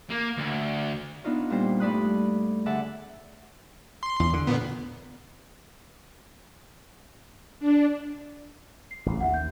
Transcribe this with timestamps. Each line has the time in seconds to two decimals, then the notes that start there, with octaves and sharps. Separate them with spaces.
0.11 A#3
0.38 D2
1.24 B3 D4 D#4 F4 C#5
1.50 A#2 G3 D4 C5
1.80 G2 A3 D5 B5 D#6 F#6
2.66 D3 G#4 D5 E5 F#5 A5
4.03 C6
4.20 E2
4.33 D3
4.47 A#2 B3
7.60 D4
8.91 C7
9.06 A1 E2
9.21 D#2 E5 F#5
9.34 G6